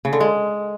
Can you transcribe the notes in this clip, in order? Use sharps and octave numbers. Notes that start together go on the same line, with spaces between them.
C#3
D3
G#3